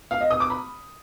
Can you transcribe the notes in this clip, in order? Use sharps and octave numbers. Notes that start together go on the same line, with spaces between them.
F5
D#5
D#6
D6
B5